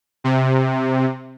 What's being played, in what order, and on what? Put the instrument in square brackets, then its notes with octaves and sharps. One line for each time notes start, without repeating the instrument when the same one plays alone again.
[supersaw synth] C3